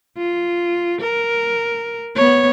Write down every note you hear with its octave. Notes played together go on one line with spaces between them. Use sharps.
F4
A#4
B3 C#5